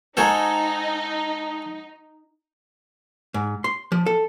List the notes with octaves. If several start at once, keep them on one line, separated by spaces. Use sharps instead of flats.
G#3 D#4 F#4 A4 C5 G#5 A#5
G#2
C6
F3
A4